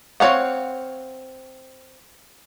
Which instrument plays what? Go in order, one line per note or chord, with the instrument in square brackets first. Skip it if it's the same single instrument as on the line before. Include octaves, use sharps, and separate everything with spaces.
[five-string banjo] C4 F4 C#5 F5 F#5